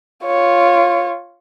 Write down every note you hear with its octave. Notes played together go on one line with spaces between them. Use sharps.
F4 C#5